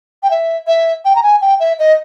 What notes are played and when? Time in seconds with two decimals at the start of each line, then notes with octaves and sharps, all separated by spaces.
0.23 G5
0.31 E5
0.67 E5
1.05 G5
1.16 A#5
1.23 G#5
1.41 G5
1.60 E5
1.79 D#5